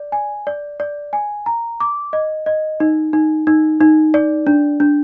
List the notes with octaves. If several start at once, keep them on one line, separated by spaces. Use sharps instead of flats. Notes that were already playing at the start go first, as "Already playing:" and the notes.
Already playing: D5
G#5
D5
D5
G#5
A#5
D6
D#5
D#5
D#4
D#4
D#4
D#4
D5
D4
D4